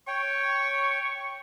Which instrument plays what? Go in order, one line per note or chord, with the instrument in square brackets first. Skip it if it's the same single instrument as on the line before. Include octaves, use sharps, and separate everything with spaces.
[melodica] C#5 G5 [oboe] C#6